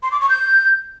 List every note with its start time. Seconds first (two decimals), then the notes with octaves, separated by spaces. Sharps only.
0.03 C6
0.12 D6
0.21 C#6
0.29 G6